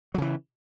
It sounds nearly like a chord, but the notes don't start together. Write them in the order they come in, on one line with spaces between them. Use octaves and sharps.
F#3 C#3 E3